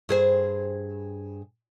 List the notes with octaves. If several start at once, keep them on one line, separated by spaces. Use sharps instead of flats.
G2 G#4 C5